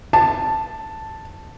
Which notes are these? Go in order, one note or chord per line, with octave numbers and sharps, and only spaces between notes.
A5